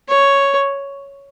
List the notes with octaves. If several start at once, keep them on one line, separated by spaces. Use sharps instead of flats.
C#5